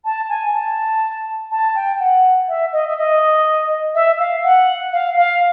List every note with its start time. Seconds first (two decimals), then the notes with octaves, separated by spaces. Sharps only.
0.04 A5
0.28 G#5
0.52 A5
1.50 A5
1.75 G5
1.99 F#5
2.48 E5
2.72 D#5
2.87 E5
2.97 D#5
3.94 E5
4.19 F5
4.43 F#5
4.92 F5
5.16 F5